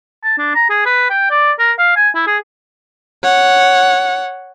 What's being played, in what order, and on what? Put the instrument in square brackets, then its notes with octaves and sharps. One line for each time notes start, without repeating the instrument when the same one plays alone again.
[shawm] A5
D4
A#5
G#4
B4
G5
D5
A#4
F5
G#5
E4
G#4
[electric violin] C#5 F#5